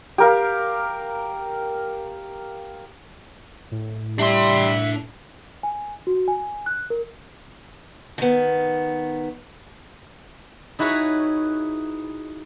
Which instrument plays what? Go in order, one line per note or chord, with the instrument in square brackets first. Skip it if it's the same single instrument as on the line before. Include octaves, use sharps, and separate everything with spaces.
[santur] G4 A#4 F5
[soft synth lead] A2
[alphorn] G3 [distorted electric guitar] D4 C6 [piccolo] E5
[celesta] G#5
F#4
G#5
F#6
A#4
[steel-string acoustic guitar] D#3 B3
[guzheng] D#4 E4 F#4 G#4 B4 C#5